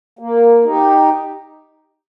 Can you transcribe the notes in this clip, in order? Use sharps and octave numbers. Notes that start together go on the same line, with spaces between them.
A#3
D#4 G4